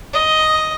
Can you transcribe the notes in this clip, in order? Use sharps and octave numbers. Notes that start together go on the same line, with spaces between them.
D#5